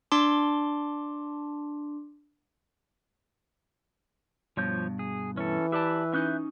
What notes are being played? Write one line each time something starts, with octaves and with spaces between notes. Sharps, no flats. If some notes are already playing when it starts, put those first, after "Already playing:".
D4 A5 C6 D6
G2 B2 F3 C#5 G6
G#4
E3 C#4 A4
G4 B4 D5 E5 A5
C#4 D#4 E5 F#6 G6